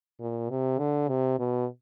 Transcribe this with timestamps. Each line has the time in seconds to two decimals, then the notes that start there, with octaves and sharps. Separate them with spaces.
0.20 A#2
0.50 C3
0.79 D3
1.09 C3
1.39 B2